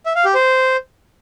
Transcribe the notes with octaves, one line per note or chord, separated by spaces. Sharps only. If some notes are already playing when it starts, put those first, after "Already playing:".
E5
F5
G4
C5